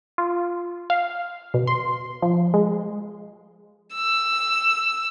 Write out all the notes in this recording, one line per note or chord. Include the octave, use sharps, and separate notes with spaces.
F4
F5
B2
C6
F3
G#3
E6